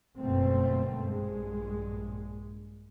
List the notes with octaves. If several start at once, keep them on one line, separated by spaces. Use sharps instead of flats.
G1 F#2 B2 A3 A#3 C4
A#1 G2 G#3